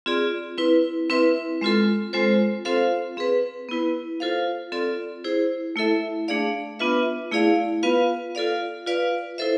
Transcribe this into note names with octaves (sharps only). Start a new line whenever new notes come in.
C4 F4 G#4 D5
C4 E4 B4
C4 E4 B4 E5
G#3 C4 F4 A4
G#3 C4 F4 A4 C5
C4 F4 A4 C5 F5
C4 G#4 B4
B3 E4 B4
F4 A4 C5 F5
C4 F4 A4 D5
E4 G#4 C5
A3 E4 A4 E5
A3 D4 G#4 D5 F5
B3 D4 F4 B4 E5
A3 E4 G#4 D5 F5
B3 F4 B4 F5
F4 A4 D5 F5
F4 B4 D5 F5
E4 A4 C5 E5